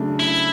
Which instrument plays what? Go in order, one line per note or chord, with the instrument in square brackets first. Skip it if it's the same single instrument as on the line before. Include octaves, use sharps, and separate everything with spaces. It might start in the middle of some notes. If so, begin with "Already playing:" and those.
Already playing: [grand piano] C#3 F#3 A3 D4
[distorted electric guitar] E4